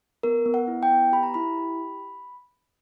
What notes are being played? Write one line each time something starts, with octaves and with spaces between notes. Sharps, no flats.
B3 A#4
B3
F#5
E4
G5
B3
G4 B5
A#5
E4 B5
G4